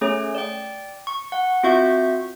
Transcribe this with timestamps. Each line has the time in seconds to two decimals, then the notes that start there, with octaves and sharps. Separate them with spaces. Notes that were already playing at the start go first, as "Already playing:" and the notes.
0.01 A3 C#4 G#4 C#5
0.35 D5 G5
1.07 C#6
1.32 F#5
1.63 C4 F4 F#4 E5 C#6 G6